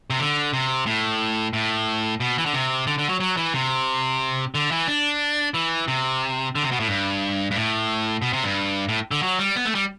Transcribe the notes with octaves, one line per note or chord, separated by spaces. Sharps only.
C3
D3
C3
A2
A2
B2
E3
D3
C3
D3
D3
F#3
F#3
E3
C3
D3
E3
D4
E3
C3
D3
C3
B2
A2
G2
G2
A2
B2
C3
G2
A2
D3
F#3
G3
B3
A3
G3